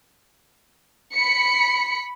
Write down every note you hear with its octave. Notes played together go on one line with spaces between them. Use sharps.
B5 B6 C#7